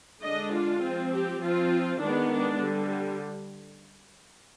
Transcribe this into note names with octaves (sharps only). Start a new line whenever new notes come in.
D3 G#3 D4 D#5
F4
F3 C4
G4
F3 C4 F4
D#3 G#3 B3 D4
D4
D3 G3